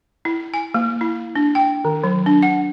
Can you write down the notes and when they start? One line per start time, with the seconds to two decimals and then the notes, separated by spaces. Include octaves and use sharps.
0.25 E4
0.54 G#5
0.74 A#3
1.01 E4
1.36 D4
1.55 G5
1.85 D#3
2.04 F#3
2.26 D4
2.43 F#5